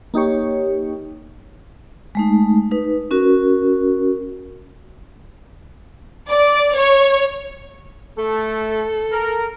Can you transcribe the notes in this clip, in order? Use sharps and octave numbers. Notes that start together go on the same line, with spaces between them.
A#3 D#4 G4 C#5
G#3 A3 D#4
D#4 B4
C#4 F#4 A#4
D5
C#5
A3 A4
A#4